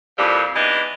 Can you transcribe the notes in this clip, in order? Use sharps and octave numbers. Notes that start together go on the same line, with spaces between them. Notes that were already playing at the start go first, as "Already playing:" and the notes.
F2 A#2 E3 F3 G3
E3 G#3 B3 D4 D#4